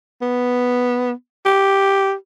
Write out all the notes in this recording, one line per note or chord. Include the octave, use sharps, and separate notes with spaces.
B3
G4